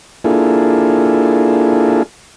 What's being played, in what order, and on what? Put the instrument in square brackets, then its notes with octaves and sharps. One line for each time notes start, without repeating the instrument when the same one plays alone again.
[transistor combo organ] A#3 D4 E4 F4 G#4 A4